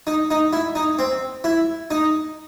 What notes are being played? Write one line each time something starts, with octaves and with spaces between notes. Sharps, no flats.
D#4
D#4
E4
D#4
C4
E4
D#4